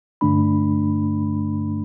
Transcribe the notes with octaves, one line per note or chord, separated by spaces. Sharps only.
G2 D3 A3 D4 B5